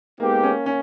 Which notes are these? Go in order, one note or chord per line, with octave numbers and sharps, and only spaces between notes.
G#3 A#3 B3 D#4 G4
C#4
C#4